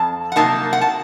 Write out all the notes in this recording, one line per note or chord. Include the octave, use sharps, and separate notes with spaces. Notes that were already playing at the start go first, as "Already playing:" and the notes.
Already playing: F2 A5
F#5
C3 F#3 A#3 D#4 A5
F#5
A5